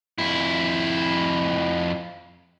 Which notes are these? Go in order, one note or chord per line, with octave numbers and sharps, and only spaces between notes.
F2 E4